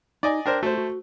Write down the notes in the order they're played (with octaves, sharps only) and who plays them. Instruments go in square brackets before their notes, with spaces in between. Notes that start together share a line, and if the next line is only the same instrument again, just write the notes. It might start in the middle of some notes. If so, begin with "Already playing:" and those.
[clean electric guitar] D#4 [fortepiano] D5 D#5 G#5
[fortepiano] D4 A#4 C5 [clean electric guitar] G5
[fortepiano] A3 C5 [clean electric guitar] F#4
[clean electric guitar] F#4